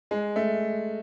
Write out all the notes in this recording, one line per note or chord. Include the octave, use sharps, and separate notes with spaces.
G#3
A3